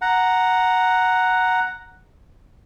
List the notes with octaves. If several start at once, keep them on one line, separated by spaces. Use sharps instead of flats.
F#5 A#5